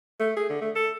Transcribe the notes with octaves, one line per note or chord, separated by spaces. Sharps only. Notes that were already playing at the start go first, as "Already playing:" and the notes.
A3
G#4
D3
A3
A4